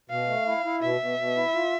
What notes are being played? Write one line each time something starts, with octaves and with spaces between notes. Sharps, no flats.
B2 F5
A3
E4
E4
B2 E5
B2
B2
E4
F4